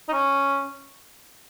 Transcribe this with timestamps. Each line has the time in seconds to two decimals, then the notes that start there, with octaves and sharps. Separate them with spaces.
0.08 D#4
0.13 C#4